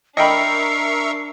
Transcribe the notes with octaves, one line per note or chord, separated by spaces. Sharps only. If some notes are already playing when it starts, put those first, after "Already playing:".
D4 A#4 D#5 E5 G5 B5 C#6 C7